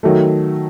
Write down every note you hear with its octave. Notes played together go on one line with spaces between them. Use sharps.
D#3 F#3 A3